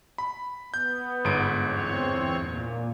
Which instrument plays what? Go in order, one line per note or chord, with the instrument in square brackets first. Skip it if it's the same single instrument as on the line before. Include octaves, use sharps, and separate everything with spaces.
[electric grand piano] B5
[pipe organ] B3 [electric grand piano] G6
[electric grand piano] G1 G#2 D7
[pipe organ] E2 C4 C#5
A#2